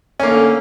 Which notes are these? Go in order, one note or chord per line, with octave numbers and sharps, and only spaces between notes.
D3 A3 A#3 C#4